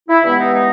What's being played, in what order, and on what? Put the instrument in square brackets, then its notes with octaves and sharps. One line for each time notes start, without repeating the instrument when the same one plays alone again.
[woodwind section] E4
G2 E3 G#3 B3 E4
D#4
D#4